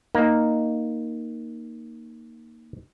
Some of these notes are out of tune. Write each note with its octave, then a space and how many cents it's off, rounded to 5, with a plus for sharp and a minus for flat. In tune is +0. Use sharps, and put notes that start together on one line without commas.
A#3 +0 D#4 +0